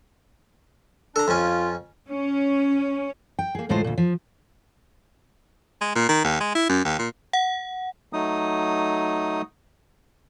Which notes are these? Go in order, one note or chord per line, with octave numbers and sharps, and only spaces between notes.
D4 A4 A#5
F2 C#4 F4
C#4
G5
A#3 G#4
D2 A2 G#3 F4 A4 C5
D2 A#2
F3
G#3
A#2
D#3
D#2
G#3
E4
F#2
D#2
A#2
F#5
F#3 A3 D#4 D#6